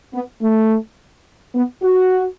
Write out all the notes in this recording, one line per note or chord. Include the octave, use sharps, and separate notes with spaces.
B3
A3
B3
F#4